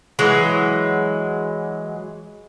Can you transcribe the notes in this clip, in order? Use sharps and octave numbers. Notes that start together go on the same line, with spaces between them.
E3 F#3 G#3